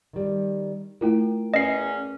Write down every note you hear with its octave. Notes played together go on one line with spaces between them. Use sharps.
D#3 G3
A3 E4 F4 A#4 G5
E2 C#4 D#5 C7